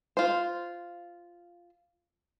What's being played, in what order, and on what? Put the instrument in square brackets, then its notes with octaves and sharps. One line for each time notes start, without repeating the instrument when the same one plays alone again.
[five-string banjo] F4 C5